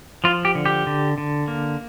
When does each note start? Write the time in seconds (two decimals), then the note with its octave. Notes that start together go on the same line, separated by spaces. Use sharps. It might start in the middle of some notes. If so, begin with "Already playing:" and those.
0.24 F3 F4
0.45 G4
0.55 D3
0.66 G4
0.87 D3
1.18 D3
1.48 A#3